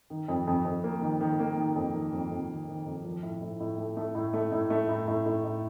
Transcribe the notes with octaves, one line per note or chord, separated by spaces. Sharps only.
D#3
F2
F2
F2
A#3
D#3
D#3
A#3
D#3
F2
D#3
F2
F2
D#3
D#3
F2
F3
A2
A2
A2
A3
A3
A2
A3
A2
A3
A2
A2
A2
A2